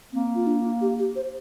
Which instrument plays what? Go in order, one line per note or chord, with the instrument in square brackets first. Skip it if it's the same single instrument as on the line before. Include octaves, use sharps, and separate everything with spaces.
[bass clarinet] A#3 [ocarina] C4
[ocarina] F4
D4
G4
G4
C5